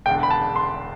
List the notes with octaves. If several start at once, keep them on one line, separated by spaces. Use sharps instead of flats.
E1 E2 D3 G5
B5
A5
C6